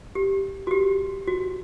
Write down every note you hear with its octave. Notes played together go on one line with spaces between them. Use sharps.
G4
F#4
G4
F#4